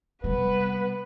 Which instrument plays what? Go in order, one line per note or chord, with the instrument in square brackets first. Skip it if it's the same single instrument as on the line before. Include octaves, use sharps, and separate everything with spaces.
[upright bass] C3 G3 [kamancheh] B3 B4